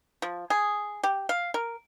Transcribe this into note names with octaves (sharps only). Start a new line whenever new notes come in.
F3
G#4
G4
F5
A#4